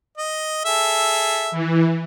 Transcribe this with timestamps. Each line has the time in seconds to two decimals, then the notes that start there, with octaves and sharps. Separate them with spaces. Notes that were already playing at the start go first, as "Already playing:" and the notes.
0.18 D#5
0.65 G#4 A4 E5
1.51 E3